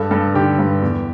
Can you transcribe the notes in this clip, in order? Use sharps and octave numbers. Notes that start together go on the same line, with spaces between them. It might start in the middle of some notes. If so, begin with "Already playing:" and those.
Already playing: G2 A4
G2 A4
D3 G4
G2
E2